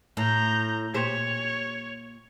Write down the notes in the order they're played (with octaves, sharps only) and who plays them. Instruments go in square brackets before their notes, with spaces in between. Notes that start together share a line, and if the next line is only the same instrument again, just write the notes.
[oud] A2 [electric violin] A#5 G6
[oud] A#2 G4 C5 [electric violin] C#5